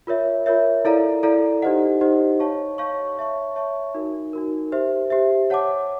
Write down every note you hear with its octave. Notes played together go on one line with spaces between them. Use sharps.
F4 A#4 C#5 E5
F4 A#4 C#5 E5
E4 A4 D5 F5 A#5
E4 A4 D5 F5 A#5
D#4 G4 C5 D#5 F#5
D#4 G4 C5 D#5 F#5
C#5 F5 A5 C#6
C#5 F5 A5 C#6
C#5 E5 A5 C#6
C#5 E5 A5 C#6
D#4 F#4 A#4
D#4 F#4 A#4
G4 C5 E5
G4 C5 E5
C#5 F#5 A5 D6